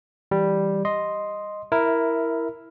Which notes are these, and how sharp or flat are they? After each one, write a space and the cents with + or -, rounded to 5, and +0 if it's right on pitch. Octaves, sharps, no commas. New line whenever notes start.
E3 +0 G3 +0
D#5 +0 C6 +0
E4 +0 A#4 +0 E5 -15